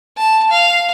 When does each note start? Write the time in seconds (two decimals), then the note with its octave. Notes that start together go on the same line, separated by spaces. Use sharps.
0.17 A5
0.51 F5